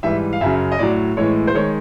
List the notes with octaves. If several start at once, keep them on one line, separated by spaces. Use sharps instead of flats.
G#2 E3 G3 E5
F5
F#2 C#3 F#3 E5
D#5
A2 F#3 D5
A2 E3 G#3 C#5
C5
D#3 G#3 C#5